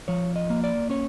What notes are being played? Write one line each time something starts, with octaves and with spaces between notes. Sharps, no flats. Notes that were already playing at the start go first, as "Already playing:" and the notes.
F3 C#5
D#5
A#3
D5
C#4 C#5